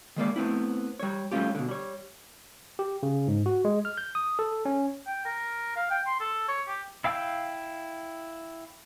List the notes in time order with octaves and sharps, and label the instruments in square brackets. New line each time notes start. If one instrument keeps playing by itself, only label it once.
[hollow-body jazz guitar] D#3 G#3 A#3 D5
A3 B3 C4 E4
G3 C#5
G3 A3 C4 C#4 F4 G4
B2 D3
G3 C#5
[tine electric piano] G4
C#3
G#2
F#4
G#3
F6
G6
D#6
A4
C#4
[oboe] G5
A#4
F5
G5
C6
A4
C#5
G4
[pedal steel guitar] E4 F5 G5 E6